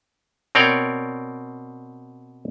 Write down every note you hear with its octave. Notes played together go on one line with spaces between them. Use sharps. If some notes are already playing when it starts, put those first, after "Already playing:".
B2 C4 A#4 C#5 D5 G5